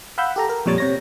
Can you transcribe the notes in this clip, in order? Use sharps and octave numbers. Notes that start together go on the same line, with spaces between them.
F5 F#5 B5 E6 G6
G4 A4 A#5
A#4
F2 A#2 G3 C#5 A6
C3 C#5 A#6